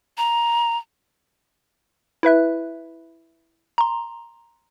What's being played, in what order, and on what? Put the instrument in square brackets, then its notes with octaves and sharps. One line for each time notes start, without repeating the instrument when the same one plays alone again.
[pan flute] A#5
[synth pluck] E4 B4 E5 F#6
A#5 C6